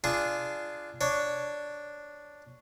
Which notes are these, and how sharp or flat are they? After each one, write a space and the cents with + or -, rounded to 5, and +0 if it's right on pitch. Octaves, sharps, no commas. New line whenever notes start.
D4 +0 F4 -25 G#4 +0
D4 +0 C#5 +10